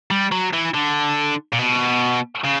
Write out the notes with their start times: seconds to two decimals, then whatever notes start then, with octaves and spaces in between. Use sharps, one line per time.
0.11 G3
0.32 F#3
0.54 E3
0.74 D3
1.53 A#2
1.59 B2
2.44 C#3